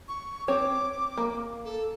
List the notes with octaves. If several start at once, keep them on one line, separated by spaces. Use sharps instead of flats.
C#6
C4 C#5 D6
A#3
A4